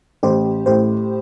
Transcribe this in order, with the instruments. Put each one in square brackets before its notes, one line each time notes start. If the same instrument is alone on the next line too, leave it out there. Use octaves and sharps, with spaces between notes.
[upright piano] A1 [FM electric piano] G4 C5
[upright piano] A2 [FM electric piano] G4 C5